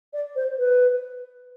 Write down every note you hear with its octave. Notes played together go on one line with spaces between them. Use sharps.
D5
C5
B4